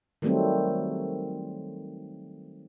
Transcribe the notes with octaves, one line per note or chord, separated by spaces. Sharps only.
D#3 F#3 G3 A3 C4